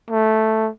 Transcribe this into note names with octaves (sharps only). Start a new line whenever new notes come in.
A3